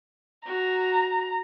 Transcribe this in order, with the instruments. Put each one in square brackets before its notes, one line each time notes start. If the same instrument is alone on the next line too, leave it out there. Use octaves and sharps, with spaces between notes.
[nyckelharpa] F#4 [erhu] A#5